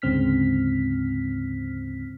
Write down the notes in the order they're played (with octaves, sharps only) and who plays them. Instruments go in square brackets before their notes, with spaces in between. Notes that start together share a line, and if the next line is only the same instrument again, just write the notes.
[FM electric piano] D2 G#2 C#3 C4 F6 B6